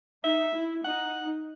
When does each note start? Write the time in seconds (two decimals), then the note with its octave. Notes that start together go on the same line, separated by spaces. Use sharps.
0.24 D#4 E5
0.54 E4
0.85 D#4 F#5